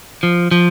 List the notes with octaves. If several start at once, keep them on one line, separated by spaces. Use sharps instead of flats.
F3
F3